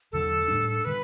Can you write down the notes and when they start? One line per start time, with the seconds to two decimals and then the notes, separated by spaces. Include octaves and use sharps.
0.12 E2 D3 F#3 A4
0.48 A2 G3 D4
0.85 D3 G3 B4